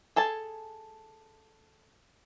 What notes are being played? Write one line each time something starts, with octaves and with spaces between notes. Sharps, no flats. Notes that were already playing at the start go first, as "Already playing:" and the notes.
G#4 A4 G#5 A5